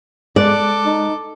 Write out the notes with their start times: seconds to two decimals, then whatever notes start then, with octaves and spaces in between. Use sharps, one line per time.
0.36 G#3 A4 D5 D6 F#6
0.86 D#4